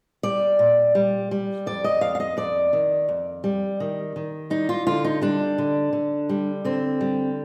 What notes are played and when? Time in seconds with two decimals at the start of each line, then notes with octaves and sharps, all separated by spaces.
0.23 G3 D5
0.59 A#2
0.95 G3
1.31 G3
1.66 F2 D5
1.84 D#5
2.01 F2 F5
2.15 F5
2.20 D#5
2.37 F2 D5
2.73 D#3
3.09 F2
3.44 G3
3.80 D#3
4.16 D#3
4.50 G3 D#4
4.69 F4
4.87 D3 F4
5.04 D#4
5.22 G3 D4
5.58 D3
5.93 D3
6.29 G3
6.65 D3 C4
7.01 G3